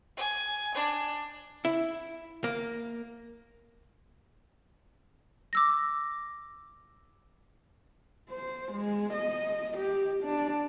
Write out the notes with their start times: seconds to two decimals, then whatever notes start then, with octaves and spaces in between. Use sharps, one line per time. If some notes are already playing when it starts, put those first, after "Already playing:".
0.16 G#5
0.74 D4
1.65 E4
2.44 A#3
5.53 D6 E6 A#6
8.30 C5
8.72 G#3
9.13 D#5
9.77 G4
10.23 D4